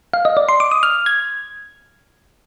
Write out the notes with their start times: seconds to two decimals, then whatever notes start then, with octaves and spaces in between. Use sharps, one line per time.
0.13 F5
0.25 D#5
0.37 D5
0.49 C6
0.60 D6
0.71 D#6
0.83 F6
1.06 G#6